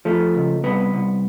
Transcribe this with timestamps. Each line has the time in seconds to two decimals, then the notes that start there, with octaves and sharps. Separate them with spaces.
0.05 F3 A3
0.35 C#2
0.63 C2 B3
0.94 C2